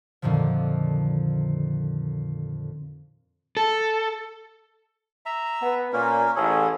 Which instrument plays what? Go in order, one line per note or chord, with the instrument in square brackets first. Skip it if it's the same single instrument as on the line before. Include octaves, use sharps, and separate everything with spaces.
[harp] F2 A#2 D3 D#3 F3
[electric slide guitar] A4
[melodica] E5 A#5
[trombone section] B3
[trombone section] A#2 [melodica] A#3 C#4 A#4
[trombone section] A1 [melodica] C#4 G#4 A4